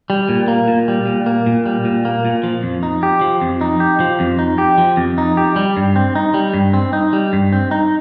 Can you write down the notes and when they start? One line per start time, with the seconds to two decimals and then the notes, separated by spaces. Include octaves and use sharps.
0.10 G3
0.29 A#2
0.48 A#3
0.68 A#2
0.88 G3
1.06 A#2
1.26 A#3
1.46 A#2
1.66 G3
1.85 A#2
2.05 A#3
2.25 A#2
2.43 F3
2.63 F2
2.83 D#4
3.03 G4
3.21 F3
3.41 F2
3.61 D#4
3.80 G4
4.00 F3
4.20 F2
4.39 D#4
4.58 G4
4.78 F3
4.97 F2
5.18 D#4
5.37 G4
5.56 G3
5.77 G2
5.96 C4
6.15 D#4
6.34 G3
6.54 G2
6.73 C4
6.93 D#4
7.13 G3
7.33 G2
7.52 C4
7.71 D#4